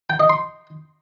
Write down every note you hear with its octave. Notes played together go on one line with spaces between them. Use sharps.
G5
D#5
C6